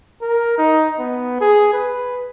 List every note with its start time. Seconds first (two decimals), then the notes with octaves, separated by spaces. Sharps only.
0.21 A#4
0.58 D#4
0.99 B3
1.40 G#4
1.73 B4